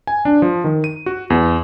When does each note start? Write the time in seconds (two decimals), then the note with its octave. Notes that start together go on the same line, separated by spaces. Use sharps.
0.07 G#5
0.25 D4
0.42 F3
0.64 D#3
0.84 D#7
1.06 F#4
1.30 E2